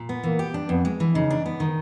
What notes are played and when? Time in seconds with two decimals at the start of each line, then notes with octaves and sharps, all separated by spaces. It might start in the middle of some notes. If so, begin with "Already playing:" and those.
Already playing: A#2
0.09 B3
0.23 E3 A#3
0.39 G4
0.54 D4
0.69 F2 B3
0.85 G#3
1.00 E3
1.15 C#3 D#4
1.30 D4
1.46 B3
1.60 D#3